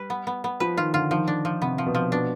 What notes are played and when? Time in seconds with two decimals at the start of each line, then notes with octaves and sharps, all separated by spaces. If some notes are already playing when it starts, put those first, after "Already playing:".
Already playing: G3 B4
0.10 B3
0.27 B3
0.44 B3
0.60 F3 B4
0.77 D#3 F4
0.94 D3 F4
1.11 D#3 F3
1.28 D4
1.45 F3
1.62 C3 B3
1.78 F3
1.86 B2
1.95 F3
2.12 B2 D4